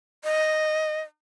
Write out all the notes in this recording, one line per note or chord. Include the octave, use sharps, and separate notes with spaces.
D#5